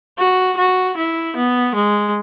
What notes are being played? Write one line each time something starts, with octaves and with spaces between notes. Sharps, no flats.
F#4
F#4
E4
B3
G#3